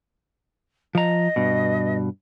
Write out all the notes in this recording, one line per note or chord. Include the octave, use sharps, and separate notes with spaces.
F3 D#5 A#5
G2 B2